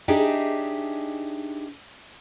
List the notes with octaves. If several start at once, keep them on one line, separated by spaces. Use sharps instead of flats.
D4 D#4 G4 G#4 E5